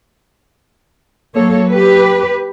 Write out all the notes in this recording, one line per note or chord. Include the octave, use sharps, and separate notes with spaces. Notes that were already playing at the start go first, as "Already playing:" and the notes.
F#3 A#3 A4 C#5
G4 B4